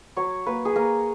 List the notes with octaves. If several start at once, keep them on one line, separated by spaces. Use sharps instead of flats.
F#3 C#5
A#3 B4
G#4
A#3 A#4